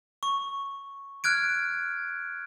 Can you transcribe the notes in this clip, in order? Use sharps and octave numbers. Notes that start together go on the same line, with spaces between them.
C#6
F6 F#6 G#6 D7